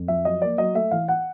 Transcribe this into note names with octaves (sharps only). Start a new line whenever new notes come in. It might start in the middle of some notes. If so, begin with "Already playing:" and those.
Already playing: F2
F3 E5
F#3 D#5
A#3 D5
F#3 D#5
A3 E5
E3 F5
F#5